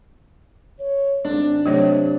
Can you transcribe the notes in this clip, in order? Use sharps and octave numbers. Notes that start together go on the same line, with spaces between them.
C#5
G#1 D4
C3 F#3 A3 C#5